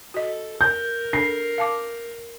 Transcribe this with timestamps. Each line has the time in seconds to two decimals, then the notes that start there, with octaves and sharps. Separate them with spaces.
0.14 F#4 A4 D#5
0.61 A#4 G6
1.13 D4 A4 C7
1.58 F5 A5 D6